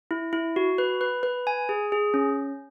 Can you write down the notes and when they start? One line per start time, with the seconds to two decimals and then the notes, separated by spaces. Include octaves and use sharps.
0.11 E4
0.33 E4
0.56 F#4
0.78 B4
1.01 B4
1.23 B4
1.47 G#5
1.69 G#4
1.92 G#4
2.14 C#4